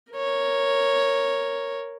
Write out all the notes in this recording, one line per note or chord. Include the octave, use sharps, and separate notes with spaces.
A#4 C#5